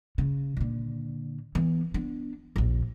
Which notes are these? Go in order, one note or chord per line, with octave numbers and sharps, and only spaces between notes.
C#3
A#2 D3
E3 B3
B3 D4
A#1 D#2